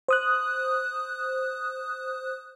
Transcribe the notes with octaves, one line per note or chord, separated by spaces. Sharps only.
C5 D#6 F#6